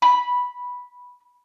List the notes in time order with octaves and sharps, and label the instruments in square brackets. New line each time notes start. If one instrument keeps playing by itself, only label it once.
[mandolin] B5